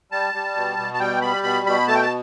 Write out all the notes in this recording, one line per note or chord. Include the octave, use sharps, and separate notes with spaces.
G3 A5
G3
B2
B2
A5
G3 G5
G3 B5
B2 B5
B2 B5
A3 A5
G5
A5